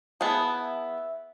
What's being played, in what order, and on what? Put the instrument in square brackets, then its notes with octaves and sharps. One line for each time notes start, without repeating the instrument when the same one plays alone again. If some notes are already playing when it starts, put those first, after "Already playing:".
[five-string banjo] B3 E4 G#4 [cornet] A5
[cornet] E5